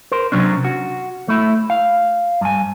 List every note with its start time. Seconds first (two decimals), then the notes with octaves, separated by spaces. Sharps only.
0.12 A#4 C5
0.32 C3 F#3 C#4 D4
0.65 F#4
1.28 A3 E4
1.70 F5
2.41 G2 G#5